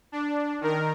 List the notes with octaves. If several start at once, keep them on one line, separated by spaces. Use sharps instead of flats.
D4
D#3 A#4